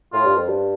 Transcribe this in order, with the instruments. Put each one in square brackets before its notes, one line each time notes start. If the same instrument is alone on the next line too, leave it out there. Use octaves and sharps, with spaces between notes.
[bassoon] A2 [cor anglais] F4
[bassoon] G2
F2
G2